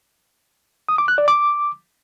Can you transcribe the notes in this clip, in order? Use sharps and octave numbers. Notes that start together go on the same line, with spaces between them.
D#6
D6
F#6
D5
D6